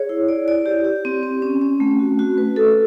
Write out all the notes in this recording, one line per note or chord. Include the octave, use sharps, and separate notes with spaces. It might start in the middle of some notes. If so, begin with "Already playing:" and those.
Already playing: G#4 C#5
E4
D5
D5
G4
G4
C4
C4
C#4
C#4
A3
F#4
F#4
B4
A4